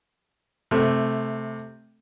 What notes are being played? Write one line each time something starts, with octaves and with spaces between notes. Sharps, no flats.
C3 A3